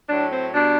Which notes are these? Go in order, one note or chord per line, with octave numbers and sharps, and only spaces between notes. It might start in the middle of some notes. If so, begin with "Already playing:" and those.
A2 F#3 D4
C4
B2 G3 D4